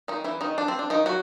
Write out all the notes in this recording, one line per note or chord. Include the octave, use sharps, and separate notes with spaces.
D#3 D#4
E3 E4
D#3 D#4
D4
C4
D4
D#3 D#4
F#3 F#4